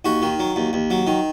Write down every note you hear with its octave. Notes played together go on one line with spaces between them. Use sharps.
D#2 F#4
D#3
F#3
D#2
D#2
F#3
D#3